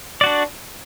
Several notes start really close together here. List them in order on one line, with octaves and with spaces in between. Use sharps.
D5 F#4 D4